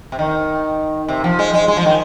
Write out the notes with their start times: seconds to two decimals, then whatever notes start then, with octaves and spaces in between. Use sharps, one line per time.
0.12 C3
0.19 D#3
1.08 C3
1.24 F3
1.39 G#3
1.54 G#3
1.68 G#3
1.77 F3
1.86 D#3